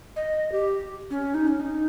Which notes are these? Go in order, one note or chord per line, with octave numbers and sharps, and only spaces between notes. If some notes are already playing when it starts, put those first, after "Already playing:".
D#5
G4
C#4
D#4
C#4
D#4